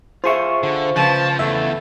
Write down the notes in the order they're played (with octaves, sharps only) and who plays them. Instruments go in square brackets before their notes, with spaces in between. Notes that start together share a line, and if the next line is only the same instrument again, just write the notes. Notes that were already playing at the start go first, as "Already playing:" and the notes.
[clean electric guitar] F4 G#4 E5 [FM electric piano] C5 C#6
[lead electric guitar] D3
[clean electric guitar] C#3 B4 [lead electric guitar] F3 [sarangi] A5
[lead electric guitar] E2 [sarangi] A3 [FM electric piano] E5